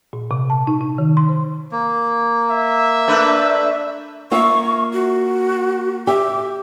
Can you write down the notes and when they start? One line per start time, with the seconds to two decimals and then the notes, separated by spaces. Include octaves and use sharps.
0.13 A#2
0.31 C3
0.50 A5
0.67 D#4
0.81 D#4
0.98 D#3
1.17 C6
1.29 C5
1.72 A#3
2.50 E5
3.08 A3 D4 B4
4.31 A#3 F4 E5 C#6
4.93 F#4
6.07 G4 E5 D6